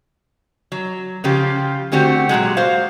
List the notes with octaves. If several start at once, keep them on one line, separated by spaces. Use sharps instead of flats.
F#3
C#3 F3 F4 G4
D3 A3 C4 F#4 G4
A#2 D3 F#3 G#3
F#4 C5 F5